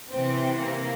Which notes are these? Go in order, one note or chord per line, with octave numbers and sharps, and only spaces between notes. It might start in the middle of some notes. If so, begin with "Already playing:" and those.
C3 E3 C4
A#3